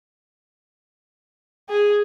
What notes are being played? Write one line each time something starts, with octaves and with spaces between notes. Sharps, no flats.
G#4